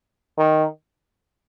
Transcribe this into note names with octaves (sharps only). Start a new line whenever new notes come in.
D#3